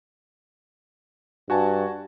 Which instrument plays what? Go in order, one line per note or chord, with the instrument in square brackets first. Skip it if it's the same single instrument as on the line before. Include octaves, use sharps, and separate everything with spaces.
[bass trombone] G2 [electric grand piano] F#4 G#5 A5